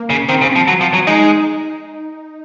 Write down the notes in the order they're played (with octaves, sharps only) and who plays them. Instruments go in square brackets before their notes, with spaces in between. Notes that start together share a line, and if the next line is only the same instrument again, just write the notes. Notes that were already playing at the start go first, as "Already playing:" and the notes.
Already playing: [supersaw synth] A#3
[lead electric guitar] C#3
[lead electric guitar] D#3 [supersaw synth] C4
[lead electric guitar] C#3
F3
F#3
F3
F#3
[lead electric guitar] G#3 [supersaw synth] D#4